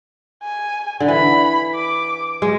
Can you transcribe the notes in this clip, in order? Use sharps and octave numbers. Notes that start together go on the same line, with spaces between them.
G#5
D3
E3 B5
D6
G#3